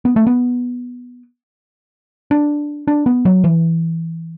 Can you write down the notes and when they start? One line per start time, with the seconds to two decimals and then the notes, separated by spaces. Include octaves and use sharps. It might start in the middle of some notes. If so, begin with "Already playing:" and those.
0.05 B3
0.16 A3
0.27 B3
2.31 D4
2.87 D4
3.06 B3
3.25 F#3
3.44 E3